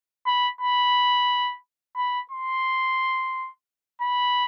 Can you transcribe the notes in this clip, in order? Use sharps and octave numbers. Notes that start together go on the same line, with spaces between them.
B5
B5
B5
C6
B5